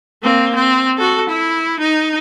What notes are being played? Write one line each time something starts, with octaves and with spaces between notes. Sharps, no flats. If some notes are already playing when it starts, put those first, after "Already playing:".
A#3 C4
C4
F#4 A4
E4
D#4